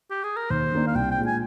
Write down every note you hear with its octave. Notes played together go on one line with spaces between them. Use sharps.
G4
G#4
A#4
D#2 C5
D#3 A#3 D4
F5
C2 G5
G5
A#2 G#3 D4
G#5